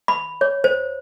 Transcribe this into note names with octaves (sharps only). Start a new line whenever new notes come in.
B5
C#5
C5